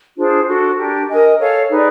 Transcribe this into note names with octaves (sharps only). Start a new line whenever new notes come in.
D4 F4 G#4 C5
D4 F#4 A4
D4 G4 A#4
A#4 D#5 G#5
A4 C#5 F5
D#4 G#4 B4 D5